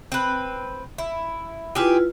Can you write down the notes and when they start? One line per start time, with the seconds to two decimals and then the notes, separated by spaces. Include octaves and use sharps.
0.12 C4 B4
0.98 E4
1.75 E4 F4 G4 G#4 B4 C5